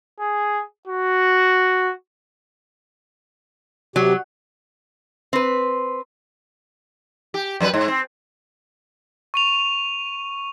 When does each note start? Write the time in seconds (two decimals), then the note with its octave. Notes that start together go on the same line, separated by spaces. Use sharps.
0.20 G#4
0.87 F#4
3.96 C3 F#3 G4
5.33 C4 B4
7.34 G4
7.60 F#2 F#3 B4
7.74 G#2
7.88 C4
9.34 C#6 D#7 F7